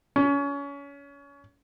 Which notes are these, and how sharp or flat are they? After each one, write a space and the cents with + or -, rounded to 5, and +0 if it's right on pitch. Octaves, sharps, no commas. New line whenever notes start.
C#4 +30